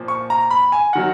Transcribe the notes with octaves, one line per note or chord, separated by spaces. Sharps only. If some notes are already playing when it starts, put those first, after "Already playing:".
Already playing: A#2 F3
C#6
A#5
B5
G#5
D#3 F#3 F#5